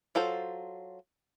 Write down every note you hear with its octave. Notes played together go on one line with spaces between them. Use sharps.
F#3 F4 A4 C5